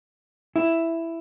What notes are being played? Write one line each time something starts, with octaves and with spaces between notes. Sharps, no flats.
E4